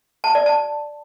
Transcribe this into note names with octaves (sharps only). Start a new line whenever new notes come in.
A5
D5
A5